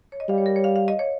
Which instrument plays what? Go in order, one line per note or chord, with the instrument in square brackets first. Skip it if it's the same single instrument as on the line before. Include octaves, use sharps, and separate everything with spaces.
[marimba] C#5
D#5
[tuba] G3 [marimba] F5
[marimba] C#5
A#4
C#5
F5
F5
D#5
C#5